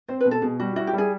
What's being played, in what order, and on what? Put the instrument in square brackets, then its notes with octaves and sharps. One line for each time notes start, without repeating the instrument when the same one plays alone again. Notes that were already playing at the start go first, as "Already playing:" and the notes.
[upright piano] C4 [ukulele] C5
[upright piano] B2 [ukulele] B4
[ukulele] A4
[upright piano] B2 [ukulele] G#4
[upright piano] G3 [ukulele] F#4
[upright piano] E4 [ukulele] F#4
[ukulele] G4
[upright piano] G3 [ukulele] G#4